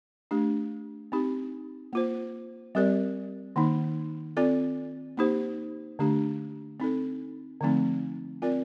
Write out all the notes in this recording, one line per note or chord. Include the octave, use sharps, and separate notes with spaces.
A3 D4 G4
C4 D#4 G4
A#3 F4 C5
G3 C4 G4 A#4 D5
D#3 A#3 D#4
C4 F4 A4 D5
A#3 D#4 G4 C5
D3 A3 D4 G4
C4 D#4 A4
D3 F3 A3 C4 D#4
C4 F4 A#4 D5